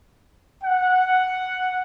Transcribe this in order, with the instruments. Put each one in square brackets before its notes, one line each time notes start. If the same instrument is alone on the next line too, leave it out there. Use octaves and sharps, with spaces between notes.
[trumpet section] F#5